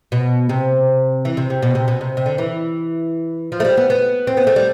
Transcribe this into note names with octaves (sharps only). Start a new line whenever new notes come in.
B2
C3
E3
C3
C3
B2
C3
B2
C3
C3
D3
E3
F3
A3
G3
B3
B3
C4
B3
A3
G3